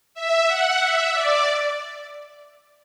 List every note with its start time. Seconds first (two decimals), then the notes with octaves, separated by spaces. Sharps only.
0.14 E5
0.47 F#5
0.79 E5
1.13 D5